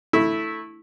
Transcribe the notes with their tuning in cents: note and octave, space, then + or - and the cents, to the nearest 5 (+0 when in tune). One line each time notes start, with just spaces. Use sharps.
A3 +0 E4 -10